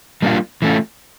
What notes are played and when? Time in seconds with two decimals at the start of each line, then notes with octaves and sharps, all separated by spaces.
0.22 G3 A#3 D4 F4
0.62 E3 A3 C#4 F4